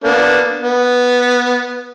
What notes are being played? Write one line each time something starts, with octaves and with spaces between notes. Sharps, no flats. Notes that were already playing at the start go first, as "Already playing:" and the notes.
A#3 B3 D4
B3